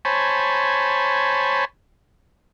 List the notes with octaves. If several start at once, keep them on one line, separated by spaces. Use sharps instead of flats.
C5 C#5 G#5 A5 B5